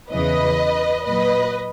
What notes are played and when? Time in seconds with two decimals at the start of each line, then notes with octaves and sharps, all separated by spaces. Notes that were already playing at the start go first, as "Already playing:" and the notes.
0.11 E2 C#3 E3 B4 D#5
1.05 A#2 F#3 B4 D#5